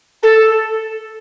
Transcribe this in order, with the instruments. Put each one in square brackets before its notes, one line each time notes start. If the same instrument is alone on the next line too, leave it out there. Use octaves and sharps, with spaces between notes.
[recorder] A4